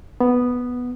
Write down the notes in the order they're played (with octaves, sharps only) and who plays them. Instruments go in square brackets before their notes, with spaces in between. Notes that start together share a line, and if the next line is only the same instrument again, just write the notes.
[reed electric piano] B3